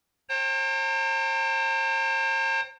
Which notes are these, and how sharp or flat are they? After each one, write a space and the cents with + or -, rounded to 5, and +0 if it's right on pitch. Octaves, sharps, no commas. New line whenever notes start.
C5 +40 G5 +0 A#5 -45